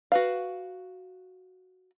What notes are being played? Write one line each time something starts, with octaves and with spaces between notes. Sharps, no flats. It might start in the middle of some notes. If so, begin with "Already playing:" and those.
F#4 B4 F5